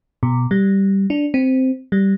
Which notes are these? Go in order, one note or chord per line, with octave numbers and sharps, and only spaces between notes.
B2
G3
D4
C4
G3